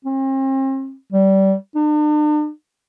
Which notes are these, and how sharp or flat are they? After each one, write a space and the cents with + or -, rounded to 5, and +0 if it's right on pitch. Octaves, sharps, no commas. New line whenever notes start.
C4 +40
G3 -25
D4 +45